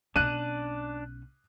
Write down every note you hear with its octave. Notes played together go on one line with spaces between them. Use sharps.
B1 C#4 D4 F#6 D#7